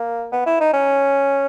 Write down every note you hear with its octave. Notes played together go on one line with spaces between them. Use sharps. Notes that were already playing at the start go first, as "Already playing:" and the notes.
Already playing: A#3
B3
E4
D#4
C#4